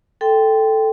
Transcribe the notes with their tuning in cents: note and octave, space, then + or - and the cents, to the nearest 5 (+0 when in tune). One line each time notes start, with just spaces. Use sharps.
A4 +0 G5 +0 C6 -10